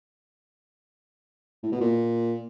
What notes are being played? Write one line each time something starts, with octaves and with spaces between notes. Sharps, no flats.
A2
B2
A#2